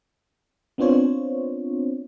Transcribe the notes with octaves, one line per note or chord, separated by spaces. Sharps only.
B3 C4 D4 F4 C5 C#5